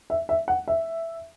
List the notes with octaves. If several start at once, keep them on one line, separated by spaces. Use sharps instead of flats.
E5
E5
F#5
E5